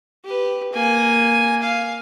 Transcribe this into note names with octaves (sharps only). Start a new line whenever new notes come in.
G4 B4
A#3 G#5
F5